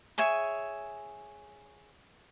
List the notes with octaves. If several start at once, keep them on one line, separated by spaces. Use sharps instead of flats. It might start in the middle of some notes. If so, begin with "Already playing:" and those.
G#4 C#5 E5 G#5